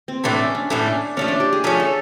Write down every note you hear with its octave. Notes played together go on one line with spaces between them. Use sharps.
C4
A2 E3 A3 D4
C#4
D4
A2 E3 A3 C#4
D4
F3 A3 C#4 D4
D4
G4
G#4
F3 A3 C#4
A4